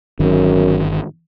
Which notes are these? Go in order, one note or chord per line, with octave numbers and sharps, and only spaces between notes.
G1 F#2 D#3